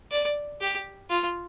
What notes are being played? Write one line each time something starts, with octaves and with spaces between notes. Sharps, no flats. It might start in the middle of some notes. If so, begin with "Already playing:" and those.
D5
G4
F4